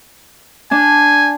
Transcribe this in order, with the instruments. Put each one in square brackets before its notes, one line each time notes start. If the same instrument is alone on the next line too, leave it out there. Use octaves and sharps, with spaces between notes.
[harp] D4 [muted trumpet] G#5